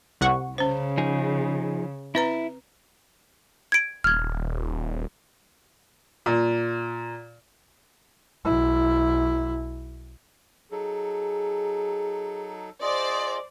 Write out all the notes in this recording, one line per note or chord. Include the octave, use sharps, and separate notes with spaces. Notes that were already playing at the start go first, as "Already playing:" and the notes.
C2 F#5 C#6
C#3 C#4 C5
F3 D#4 G#4
C4 E4 B4 A#5
G#6 D7
D#1 F6 G#6
A#2
B1 E4
F#3 D#4 G#4 A4
F4 G#4 C5 D5 D#5